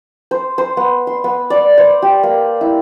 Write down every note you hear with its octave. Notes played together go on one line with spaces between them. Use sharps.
C5
C5
B3
C6
B3
D5
C5
G4
A#3
E4